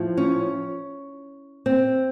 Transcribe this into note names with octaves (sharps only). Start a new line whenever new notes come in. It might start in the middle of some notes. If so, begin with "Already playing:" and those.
Already playing: A2 F3
C#4
C4